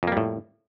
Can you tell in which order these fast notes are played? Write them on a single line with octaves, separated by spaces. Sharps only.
F2 A#3 G3 A2